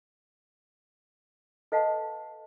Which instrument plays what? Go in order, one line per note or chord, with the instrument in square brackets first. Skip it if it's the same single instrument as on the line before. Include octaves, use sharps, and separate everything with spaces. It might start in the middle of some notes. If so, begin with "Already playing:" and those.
[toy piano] A4 B4 D#5 F5 F#5 A5